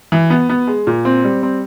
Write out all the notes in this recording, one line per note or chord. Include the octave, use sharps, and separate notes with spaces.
E3
B3
B3
G#3
A#2
C4
G3
C4